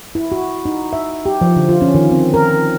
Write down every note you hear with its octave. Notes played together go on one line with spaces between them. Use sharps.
E4
F#4
D#4
E5
G4
F3
D3
F4
C#4
D#3
C4
A#4